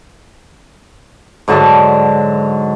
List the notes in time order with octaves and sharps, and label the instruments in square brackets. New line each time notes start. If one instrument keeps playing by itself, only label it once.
[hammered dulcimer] G#2 D3 F#3 A5